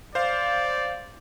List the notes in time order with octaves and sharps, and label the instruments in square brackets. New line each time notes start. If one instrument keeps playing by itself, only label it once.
[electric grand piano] C5 F5 [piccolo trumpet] D5